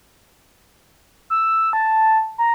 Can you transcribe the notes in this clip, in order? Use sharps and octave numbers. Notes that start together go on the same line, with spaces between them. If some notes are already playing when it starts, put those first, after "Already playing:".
E6
A5
A#5